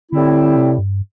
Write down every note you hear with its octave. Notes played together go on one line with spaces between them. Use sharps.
A2 D3 G3 C4 E4
C3
G2